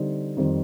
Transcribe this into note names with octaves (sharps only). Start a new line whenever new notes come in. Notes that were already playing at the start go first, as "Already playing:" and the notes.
Already playing: D3 G3 C4 D#4
F2 D#3 G3 C4